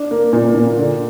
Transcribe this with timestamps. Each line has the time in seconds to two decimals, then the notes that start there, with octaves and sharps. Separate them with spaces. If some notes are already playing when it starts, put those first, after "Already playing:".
Already playing: D4
0.11 A#3
0.33 A#2
0.54 A#2
0.77 D3